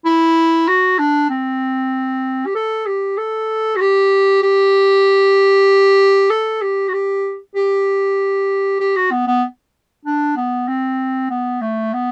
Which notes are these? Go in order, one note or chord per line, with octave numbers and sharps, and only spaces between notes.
E4
F#4
D4
C4
G4
A4
G4
A4
F#4
G4
G4
A4
G4
F#4
G4
G4
G4
F#4
B3
B3
D4
B3
C4
B3
A3
B3